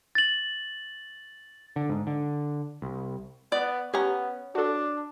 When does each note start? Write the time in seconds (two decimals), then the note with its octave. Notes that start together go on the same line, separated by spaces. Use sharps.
0.15 A6 F#7
1.76 D3
1.89 G#2
2.07 D3
2.82 C2
3.52 B3 D5
3.94 B3 C#4 G4 A#5
4.55 D4 F#4 A4